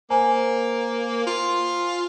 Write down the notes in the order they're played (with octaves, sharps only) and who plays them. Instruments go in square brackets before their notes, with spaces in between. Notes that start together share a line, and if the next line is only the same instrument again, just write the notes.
[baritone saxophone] A#3 [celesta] C5 G#5 A#5
[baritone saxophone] F4